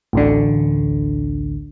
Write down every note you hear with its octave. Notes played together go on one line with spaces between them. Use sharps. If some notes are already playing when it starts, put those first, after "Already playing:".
A1 D2 D3